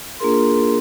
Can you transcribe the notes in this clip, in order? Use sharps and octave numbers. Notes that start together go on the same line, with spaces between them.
A#3 D4 F4 G#4 A#4 C6